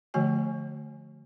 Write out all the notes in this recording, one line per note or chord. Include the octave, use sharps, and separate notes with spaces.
D3 F3 A3 F#4 C#5 G#5